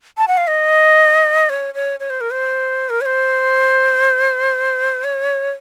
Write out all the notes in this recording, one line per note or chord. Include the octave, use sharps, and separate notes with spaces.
A5
F#5
F5
D#5
C#5
C#5
C#5
C5
A#4
C5
A#4
C#5
C5
C#5